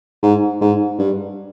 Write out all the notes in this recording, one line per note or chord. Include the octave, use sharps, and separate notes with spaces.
G#2
G#2
G2